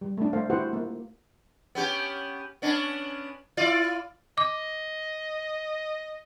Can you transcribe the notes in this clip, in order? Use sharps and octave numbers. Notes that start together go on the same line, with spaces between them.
G3
A3 D4
A3 C5 F5
E4 F#4 G4 B4 C5 F#5
A#3
B3 C#4 G4
B3 C#4 D4
E4 F4 D5
D#5 D6